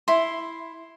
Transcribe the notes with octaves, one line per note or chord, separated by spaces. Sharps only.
E4 C6